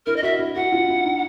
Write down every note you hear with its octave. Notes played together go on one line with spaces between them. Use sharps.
E4 A#4
D#5
F#4 E5
E4
F#4 F#5
F4
E4
D#4